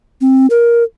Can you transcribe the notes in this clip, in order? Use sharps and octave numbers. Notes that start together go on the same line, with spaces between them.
C4
A#4